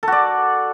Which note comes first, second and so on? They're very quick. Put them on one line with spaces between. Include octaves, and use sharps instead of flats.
A4 F#4 D5